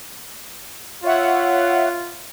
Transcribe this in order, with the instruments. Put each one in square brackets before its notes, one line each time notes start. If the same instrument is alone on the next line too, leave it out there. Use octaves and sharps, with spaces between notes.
[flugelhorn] F4 [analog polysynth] C#5 E5 F#5